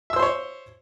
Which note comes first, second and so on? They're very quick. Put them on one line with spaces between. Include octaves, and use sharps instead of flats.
E5 E6 C5 C6 C#5